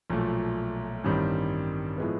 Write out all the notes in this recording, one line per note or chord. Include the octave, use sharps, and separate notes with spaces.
B1 A#2 F3 A3
A1 G2 D#3 G3 C4
A2 F3 G#3 B3